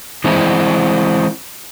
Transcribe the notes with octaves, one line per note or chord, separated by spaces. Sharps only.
E3 G#3 C4 E4